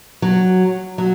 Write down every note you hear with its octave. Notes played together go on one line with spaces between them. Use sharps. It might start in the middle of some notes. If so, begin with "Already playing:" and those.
F#3
F#3